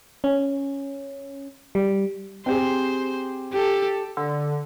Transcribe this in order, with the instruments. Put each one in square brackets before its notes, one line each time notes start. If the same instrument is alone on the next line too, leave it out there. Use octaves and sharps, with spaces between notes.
[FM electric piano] C#4
G3
[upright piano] C4 G4 G#4 [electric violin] C5
[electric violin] G4 A4
[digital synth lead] D3